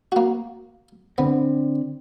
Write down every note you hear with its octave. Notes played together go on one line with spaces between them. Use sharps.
A#3 F#4
D3 B3 C4